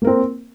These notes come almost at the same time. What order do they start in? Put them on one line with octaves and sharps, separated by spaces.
A#3 A#4 C4